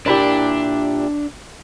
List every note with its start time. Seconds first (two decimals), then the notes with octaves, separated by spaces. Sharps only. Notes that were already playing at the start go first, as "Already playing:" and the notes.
0.06 A#2 D4 E4 G4